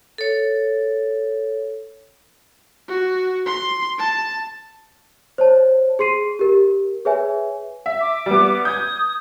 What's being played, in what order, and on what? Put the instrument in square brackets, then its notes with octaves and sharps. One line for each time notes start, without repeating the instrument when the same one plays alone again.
[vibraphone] A4 C#5
[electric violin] F#4
C6
A5
[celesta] C5 C#5 A5
G#4 C6 C7 D#7
G4 A#4
G#4 B4 C#5 E5 G#5
[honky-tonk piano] E5
[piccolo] D6
[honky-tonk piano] G3 B3
[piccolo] D#6 [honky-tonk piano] G6 G#6